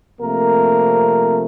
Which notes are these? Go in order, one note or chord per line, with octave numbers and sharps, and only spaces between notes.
C3 F3 A3 A#3 C4 A#4